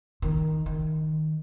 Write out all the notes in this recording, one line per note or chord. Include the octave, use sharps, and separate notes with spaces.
D#3
D#3